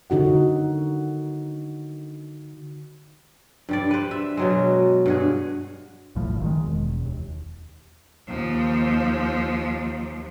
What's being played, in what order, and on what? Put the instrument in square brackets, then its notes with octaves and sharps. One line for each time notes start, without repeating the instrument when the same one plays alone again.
[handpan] D3 D#4 F#4 F#5
[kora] G2 G3 D5
B4 C5
E5
B2 F#3 G#3
G2 F#4 G#4
[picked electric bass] B1 A2 F3
G1
D#3 G#3
E1
D#2
[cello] D#2 F3